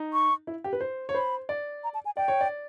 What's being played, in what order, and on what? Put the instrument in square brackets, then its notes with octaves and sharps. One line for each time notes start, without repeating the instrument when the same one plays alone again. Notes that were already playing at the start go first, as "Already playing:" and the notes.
Already playing: [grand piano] D#4
[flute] C#6
[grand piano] E4
G4
B4
C5
C#5
[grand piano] C5 [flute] B5
[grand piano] D5
[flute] A#5
A5
G#5
[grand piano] D5 [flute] G5
[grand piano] C#5
D5